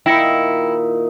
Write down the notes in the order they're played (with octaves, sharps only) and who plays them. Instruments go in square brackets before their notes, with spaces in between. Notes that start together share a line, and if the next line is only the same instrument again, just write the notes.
[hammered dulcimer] A#2 D#3 D#4 [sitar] E4 [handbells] G5 A#6 C#7